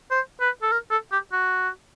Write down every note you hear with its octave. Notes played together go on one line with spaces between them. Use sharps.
C5
B4
A4
A#4
A4
G4
F#4